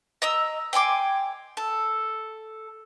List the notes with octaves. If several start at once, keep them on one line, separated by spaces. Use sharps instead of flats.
D#5 A#5 D#6 E6
G5 G#5 C6 D6
A4